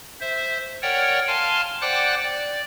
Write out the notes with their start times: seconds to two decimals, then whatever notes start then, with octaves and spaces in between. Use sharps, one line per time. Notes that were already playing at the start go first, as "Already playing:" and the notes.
0.21 C5 E5
0.82 A#4 C#5 D5 F#5 G5
1.27 F5 G#5 A5 C6 F6
1.82 C5 D5 F#5 G5 D6 F#6
2.23 D5